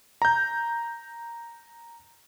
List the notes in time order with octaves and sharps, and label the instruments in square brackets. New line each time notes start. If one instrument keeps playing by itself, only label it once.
[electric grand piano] A#5 G6